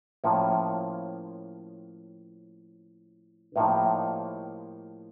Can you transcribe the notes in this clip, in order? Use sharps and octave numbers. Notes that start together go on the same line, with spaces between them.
A2 F3 A#3 C#4
A2 F3 A#3 D#4 G4